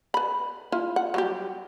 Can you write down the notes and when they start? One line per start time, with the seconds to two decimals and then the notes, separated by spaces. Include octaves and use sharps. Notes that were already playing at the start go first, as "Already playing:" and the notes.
0.14 B4 B5
0.72 E4 F4
0.96 F#5
1.14 F#3 G3 G4